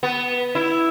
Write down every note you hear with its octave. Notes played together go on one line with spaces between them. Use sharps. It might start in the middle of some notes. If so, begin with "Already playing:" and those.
B3
E4